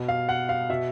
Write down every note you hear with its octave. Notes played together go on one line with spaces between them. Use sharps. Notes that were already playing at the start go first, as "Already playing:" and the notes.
Already playing: B2
F5
F#5
F5
B2 E5